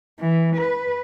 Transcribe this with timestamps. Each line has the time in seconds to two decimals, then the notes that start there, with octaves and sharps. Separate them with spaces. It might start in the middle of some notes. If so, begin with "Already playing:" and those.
0.20 E3
0.56 B4